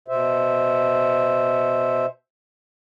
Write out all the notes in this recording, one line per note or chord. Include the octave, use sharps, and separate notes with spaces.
B2 C5 E5